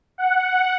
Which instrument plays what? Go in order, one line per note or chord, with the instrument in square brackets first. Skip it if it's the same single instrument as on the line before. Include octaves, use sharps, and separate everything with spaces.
[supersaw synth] F#5